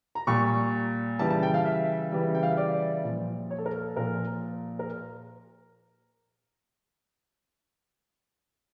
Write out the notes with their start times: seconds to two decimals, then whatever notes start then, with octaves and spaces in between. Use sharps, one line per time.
0.15 A#5
0.27 A#2 G3 C#6
1.19 C#3 E3 G3 A5
1.30 A5
1.43 G5
1.54 F5
1.66 E5
2.12 C#3 E3 G3
2.34 G5
2.43 F5
2.51 E5
2.57 D5
3.04 A#2 F3
3.50 C#5
3.58 A4
3.66 A#4
3.81 A4
3.96 A#2 F3 A#4
4.79 A#4